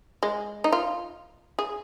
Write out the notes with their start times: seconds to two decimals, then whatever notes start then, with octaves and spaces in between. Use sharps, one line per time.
0.23 G#3
0.64 D#4
0.72 F4
1.59 G#4